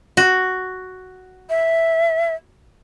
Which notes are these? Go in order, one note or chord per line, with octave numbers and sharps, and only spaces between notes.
F#4
E5